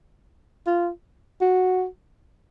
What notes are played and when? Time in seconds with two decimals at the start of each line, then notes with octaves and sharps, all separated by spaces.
0.66 F4
1.41 F#4